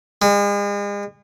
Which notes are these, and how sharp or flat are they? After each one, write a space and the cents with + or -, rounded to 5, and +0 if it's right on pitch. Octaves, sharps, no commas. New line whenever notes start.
G#3 -40